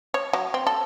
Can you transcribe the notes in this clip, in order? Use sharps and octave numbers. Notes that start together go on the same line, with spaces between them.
C#5
F#3
C4
A4